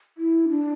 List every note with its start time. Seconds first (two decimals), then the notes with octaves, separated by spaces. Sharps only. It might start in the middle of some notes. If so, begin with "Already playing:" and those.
0.18 E4
0.49 D4